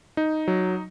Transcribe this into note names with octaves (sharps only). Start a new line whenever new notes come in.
D#4
F#3